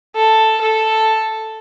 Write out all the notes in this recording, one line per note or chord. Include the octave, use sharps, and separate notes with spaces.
A4
A4